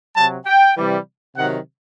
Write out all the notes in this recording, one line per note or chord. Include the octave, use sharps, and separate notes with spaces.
C3 F#3 A5
G5
C3 E3 G3
C3 D#3 F#3 F#5